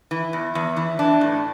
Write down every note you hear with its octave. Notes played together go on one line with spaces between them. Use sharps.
E3
E2
E2
E3
E3 D4
A2